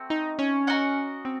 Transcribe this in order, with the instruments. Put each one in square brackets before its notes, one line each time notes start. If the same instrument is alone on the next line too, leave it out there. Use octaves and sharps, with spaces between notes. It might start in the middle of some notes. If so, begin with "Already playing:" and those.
Already playing: [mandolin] A3 C4 F#4
[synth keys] D#4
C#4
[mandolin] F#4 A#4 D#5 F#5
[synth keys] C4